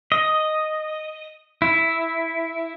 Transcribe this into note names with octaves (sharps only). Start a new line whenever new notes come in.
D#5
E4